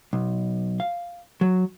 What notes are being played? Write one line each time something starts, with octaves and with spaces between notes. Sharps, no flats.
B1
F5
F#3